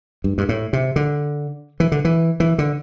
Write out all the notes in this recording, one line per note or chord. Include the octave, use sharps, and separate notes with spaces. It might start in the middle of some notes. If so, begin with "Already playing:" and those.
G2
G2
A2
C3
D3
E3
D3
E3
E3
D3